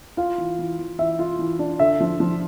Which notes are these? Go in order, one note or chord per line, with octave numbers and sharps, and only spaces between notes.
F4 F5
E3
E3
E3
E3 E5
F4
E3
D4
D3 E5
F3
F3